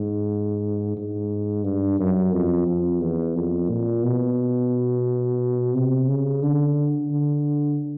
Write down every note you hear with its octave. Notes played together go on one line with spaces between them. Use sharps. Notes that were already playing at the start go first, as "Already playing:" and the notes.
Already playing: G#2
G#2
G2
F#2
F2
F2
E2
F2
A#2
B2
C3
C#3
D3
D3